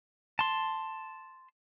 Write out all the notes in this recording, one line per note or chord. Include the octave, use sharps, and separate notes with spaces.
A5 C6